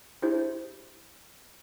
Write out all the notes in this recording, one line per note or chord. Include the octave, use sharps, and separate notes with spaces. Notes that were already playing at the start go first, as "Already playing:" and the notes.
D4 E4 G4 G#4 C5